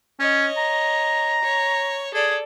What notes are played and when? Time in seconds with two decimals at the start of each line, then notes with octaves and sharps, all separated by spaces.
0.20 C#4 C#5 D#5
0.57 A#5
1.43 C#5
2.14 G#4 A4 D5